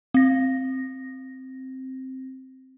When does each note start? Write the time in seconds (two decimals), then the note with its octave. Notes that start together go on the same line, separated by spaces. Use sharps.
0.14 C4 A#6